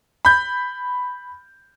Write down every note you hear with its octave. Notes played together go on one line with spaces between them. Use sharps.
B5 G6